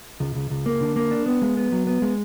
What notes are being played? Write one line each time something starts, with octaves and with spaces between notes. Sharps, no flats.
C#2
C#2
C#2
A#3
D3
A#3
D4
B3
G#3
B3
F#3
B3
G#3